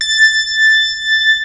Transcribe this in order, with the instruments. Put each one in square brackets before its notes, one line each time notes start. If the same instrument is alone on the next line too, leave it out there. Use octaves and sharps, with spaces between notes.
[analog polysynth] A6